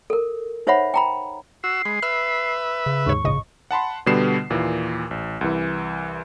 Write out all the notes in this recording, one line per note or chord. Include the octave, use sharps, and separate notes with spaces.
A4 A#4
D#4 C5 C#5 E5 F#5 B5
G5 A#5 B5
F#4 E6 C7
G#3 B5
B4 E5 F6
C#3
D#2 G#2 C#5 C#6
A#1 G#2 C#3 D#5
F#5 A5 B5 C6
B2 D3 G3 B3 C7 E7
D#2 A#2 E3
A1
C2 E3